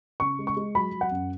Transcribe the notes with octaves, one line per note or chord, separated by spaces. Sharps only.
C#3 C#6
G#3
C#6
G#3
F#3 B5
F#3
F#5
F#2